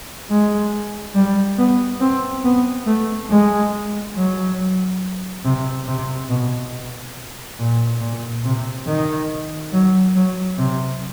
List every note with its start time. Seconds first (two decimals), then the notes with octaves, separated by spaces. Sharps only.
0.31 G#3
1.15 G3
1.58 B3
2.01 C4
2.44 B3
2.87 A3
3.30 G#3
4.15 F#3
5.44 C3
5.87 C3
6.29 B2
7.59 A#2
8.01 A#2
8.45 C3
8.87 D#3
9.73 F#3
10.15 F#3
10.58 C3